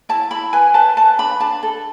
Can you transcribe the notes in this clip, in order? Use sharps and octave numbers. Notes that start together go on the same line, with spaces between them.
E4 A5
E4 B5
B4 G#5
B4 A5
B4 A5
D4 B5
D4 A5
A4